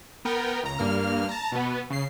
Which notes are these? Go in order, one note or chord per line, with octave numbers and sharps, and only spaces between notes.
B3 A#4 G5
C#2 A#5
G2 A#3 F6
A5 A#5
B2 B3
C#3 C7